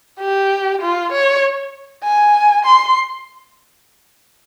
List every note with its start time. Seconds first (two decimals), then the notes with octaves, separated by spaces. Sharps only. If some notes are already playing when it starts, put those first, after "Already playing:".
0.20 G4
0.81 F4
1.12 C#5
2.03 G#5
2.65 C6